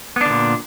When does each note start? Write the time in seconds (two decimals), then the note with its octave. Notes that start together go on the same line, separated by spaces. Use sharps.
0.16 B3
0.21 D4
0.26 D3
0.30 A#2